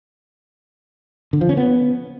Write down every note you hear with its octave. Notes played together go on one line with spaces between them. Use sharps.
D3
F3
C#4
B3